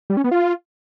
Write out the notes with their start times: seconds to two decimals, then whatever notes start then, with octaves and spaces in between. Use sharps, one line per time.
0.10 G3
0.17 C#4
0.24 B3
0.31 F4